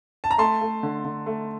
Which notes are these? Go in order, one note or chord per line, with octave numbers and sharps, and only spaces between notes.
A5
A#5
A3 A5 C6
A3
D3
D3
A3